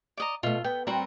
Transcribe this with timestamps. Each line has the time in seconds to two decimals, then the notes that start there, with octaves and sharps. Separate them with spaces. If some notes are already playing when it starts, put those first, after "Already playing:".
0.17 D5 D#5 A#5
0.43 B2 A3 F4
0.64 B3 G5
0.87 G3 C4 F#4 A#4 B4